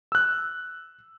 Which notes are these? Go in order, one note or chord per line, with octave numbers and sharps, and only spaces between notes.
E6 F#6